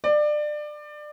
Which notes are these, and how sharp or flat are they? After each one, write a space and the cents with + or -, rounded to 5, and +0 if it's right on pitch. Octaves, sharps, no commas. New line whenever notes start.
D5 +25